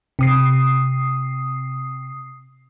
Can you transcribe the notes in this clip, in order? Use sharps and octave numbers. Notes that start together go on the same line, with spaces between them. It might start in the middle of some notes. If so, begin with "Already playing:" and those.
C3 D#6 C7